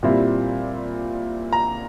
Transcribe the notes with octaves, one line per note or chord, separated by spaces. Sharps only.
A#2 G3 C4 E4
A#5